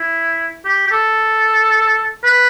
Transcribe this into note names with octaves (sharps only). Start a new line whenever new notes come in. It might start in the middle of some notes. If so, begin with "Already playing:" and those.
Already playing: E4
G4
G4
A4
B4